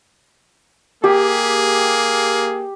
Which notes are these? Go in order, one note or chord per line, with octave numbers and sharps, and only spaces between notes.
A#3 G4 G#4